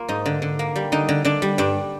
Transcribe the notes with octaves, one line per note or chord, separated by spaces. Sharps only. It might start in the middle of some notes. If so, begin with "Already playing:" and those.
Already playing: A#3 F4
G#2 D#4
D3
D3
A#3
G3
D3 D#4
D3
D3 D4
G3
G2 D4